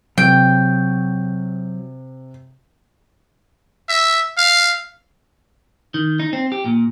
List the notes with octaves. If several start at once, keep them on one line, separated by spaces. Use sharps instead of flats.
C3 F#3 G5
E5
F5
D#3
D#4
C4
G4
A#2